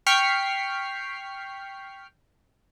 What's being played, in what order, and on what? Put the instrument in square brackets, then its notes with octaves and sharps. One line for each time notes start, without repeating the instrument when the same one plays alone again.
[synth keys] G5 C#6 F6 B6 C7